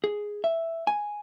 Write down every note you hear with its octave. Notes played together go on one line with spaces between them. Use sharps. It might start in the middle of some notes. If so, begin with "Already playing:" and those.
G#4
E5
G#5